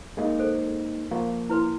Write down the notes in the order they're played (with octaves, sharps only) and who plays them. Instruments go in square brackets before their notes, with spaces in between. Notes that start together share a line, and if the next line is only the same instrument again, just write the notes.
[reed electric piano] G#3 A#3 D#4
[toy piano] A4 C5
[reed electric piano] F3 A#3 [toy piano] F5 C#6
[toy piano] E4 B4 C6